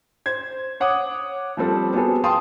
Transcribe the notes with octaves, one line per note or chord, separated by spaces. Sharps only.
C5 G#6
C#5 F#5 D6 D#6
F3 G3 C4 A4
B3 F#4 G#4 A4
F5 G5 A5 C6 D#6